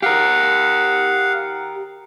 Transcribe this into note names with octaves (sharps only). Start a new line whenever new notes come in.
G4 A#4 F5 F#5